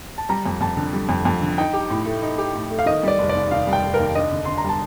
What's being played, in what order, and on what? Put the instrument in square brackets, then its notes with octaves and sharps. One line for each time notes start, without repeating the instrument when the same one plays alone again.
[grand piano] A5
[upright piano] G3 [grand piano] A#5
[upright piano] F2
[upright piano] F2 [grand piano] A5
[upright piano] D3
G3
F2
F2
D3
[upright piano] D#4 [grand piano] G5
[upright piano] G4
A2
A3
D#4
G4
A2
A3
[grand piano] F5
[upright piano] D#3 [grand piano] D#5
[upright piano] G3 [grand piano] D5
[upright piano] F1
[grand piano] D5
[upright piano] D#2
[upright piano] D#3 [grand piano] F5
[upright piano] G3
[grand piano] G5
[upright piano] F1
[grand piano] A#4
[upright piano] D#2
[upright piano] D4 [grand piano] D#5
[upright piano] D3
[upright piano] D3 [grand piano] C6
[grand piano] A#5
[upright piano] G3 [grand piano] A5